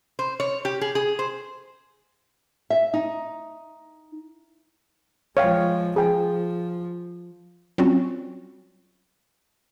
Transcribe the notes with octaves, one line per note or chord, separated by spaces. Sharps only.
C5
C#5
G4
G#4
G#4
C5
E5
D#4
F3 G#3 C#5 F5 G5
F3 G#4 G5
F#3 G3 C4 C#4 F4 F#4